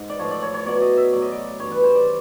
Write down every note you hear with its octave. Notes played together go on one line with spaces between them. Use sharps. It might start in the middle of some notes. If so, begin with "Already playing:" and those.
Already playing: G#2
D5
A2 F3 C#5
D5
C#5
C#5
B2 F#3 D5
D#5
E5
A2 F#3 D5
D#5
D5
G2 E3 C#5
B4
C5
D5